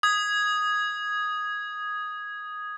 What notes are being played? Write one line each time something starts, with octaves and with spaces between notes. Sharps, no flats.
D#6 G#6